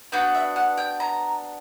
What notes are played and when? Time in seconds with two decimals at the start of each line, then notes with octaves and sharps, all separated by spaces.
0.12 B3 D4 F#4 G5
0.35 E5
0.56 F#5
0.77 G5
1.00 A#5